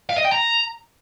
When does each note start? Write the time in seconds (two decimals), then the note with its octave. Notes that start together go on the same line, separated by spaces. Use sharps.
0.10 F5
0.17 D#5
0.25 G5
0.32 A#5